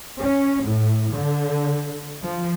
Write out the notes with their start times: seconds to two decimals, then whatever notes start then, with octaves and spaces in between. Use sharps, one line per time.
0.21 C#4
0.66 A2
1.16 D3
2.21 F3